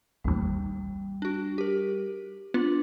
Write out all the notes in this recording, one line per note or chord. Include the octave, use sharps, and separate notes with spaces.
A1 D#2 G3
D4 F#4
G4 A#4
B3 D4 F4